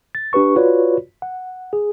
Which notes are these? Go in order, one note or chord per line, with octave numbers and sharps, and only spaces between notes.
A6
D4 G4 B4 C#6
F4 F#4 B4 C#5 D5
F#5
G#4